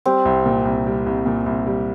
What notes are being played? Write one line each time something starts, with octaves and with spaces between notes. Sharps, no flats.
G3 C4
C2
A#2
C2
G3
C2
A#2
C2
G3